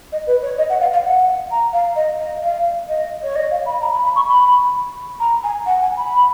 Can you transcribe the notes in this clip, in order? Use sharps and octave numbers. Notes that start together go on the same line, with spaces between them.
D#5
B4
C#5
D#5
F#5
F5
F5
F#5
A#5
F5
D#5
D#5
F5
D#5
C#5
D#5
F5
B5
A#5
B5
B5
C#6
B5
A#5
G#5
F#5
G#5
B5